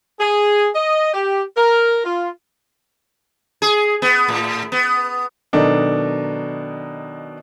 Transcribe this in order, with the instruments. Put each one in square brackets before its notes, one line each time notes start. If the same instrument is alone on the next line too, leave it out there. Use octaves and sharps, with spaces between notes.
[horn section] G#4
D#5
G4
A#4
F4
[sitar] G#4
B3
A2
B3
[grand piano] B2 D#3 F#3 D4 D#4 A4